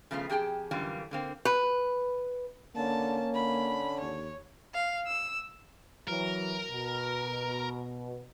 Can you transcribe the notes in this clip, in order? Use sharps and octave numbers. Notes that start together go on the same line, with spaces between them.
C#3 F3 A3 B3 F4
F2 G4 G#4 G5 A5
F#2 D3 E3 G3 A#3 F4
D3 A#3 C4
B4
D3 A#3 C#4 A5
D3 B5
D#2 C#5
F5
E6
E3 F#3 A#4
B2